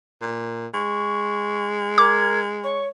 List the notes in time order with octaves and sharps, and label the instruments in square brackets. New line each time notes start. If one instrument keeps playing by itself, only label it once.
[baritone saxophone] A#2
[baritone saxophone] G#3 [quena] C#6
[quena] A#4 [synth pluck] D6 [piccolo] G#6
[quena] C#5 [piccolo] C#6